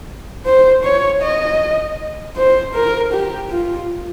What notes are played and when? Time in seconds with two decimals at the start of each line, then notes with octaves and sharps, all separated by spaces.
0.46 C5
0.84 C#5
1.22 D#5
2.36 C5
2.75 A#4
3.13 G4
3.51 F4